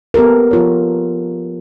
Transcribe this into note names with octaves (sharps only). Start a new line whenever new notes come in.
B3 G4 A4 A#4
F3 F4 C#5